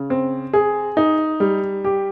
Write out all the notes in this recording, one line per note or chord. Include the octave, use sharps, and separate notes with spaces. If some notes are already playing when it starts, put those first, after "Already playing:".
Already playing: C#3
C4
G#4
D#4
G3
G4